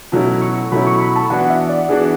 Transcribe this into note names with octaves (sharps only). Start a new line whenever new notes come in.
B2 F#3 A3 C#4 E4
C#6
B2 F#3 A3 C#4 E4 B5
C#6
B5
A5
E3 B3 D4 F#4 F#5
E5
D5
E3 B3 D4 F#4 G#4